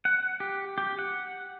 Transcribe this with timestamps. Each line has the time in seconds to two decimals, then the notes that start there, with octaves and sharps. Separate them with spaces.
0.05 F#5
0.40 G4
0.78 G4
0.99 F#5